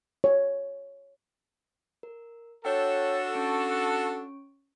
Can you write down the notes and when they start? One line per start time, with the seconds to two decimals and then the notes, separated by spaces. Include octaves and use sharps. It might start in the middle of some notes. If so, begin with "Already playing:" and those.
0.24 C#5
2.03 A#4
2.65 D4 F#4 A4 C#5 G5
3.35 C#4 C#6 D7